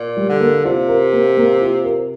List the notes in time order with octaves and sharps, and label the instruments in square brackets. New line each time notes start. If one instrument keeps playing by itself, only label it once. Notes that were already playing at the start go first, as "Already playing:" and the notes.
Already playing: [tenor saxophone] A#2
[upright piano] G3
[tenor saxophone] D3
[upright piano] A#3
[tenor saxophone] C3 [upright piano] F4
[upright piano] A#4
A#3
A#3
F4
A#4